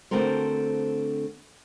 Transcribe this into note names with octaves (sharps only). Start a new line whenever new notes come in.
D3 A3 C4 F#4 A#4 C5